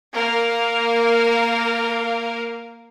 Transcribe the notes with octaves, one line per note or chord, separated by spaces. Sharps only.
A#3 A#4 F5